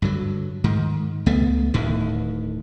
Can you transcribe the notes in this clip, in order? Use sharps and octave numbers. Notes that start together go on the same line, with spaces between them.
G2 D3 F#3
G#2 D#3
C#2 A3 B3
D1 D2 A2 D#3